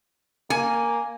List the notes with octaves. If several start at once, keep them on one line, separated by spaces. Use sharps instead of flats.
A#3 G#5